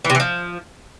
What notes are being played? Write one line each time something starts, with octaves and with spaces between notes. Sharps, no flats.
E3
C3
E3
F3